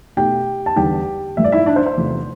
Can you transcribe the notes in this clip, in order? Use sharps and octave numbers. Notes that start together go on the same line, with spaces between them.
B2 A3 G4 G5
A5
E2 D3 G3 G4 G5
G2 F3 A3 E5
D5
E4 E5
D4 D5
C5
C5
E2 C3 F3 A3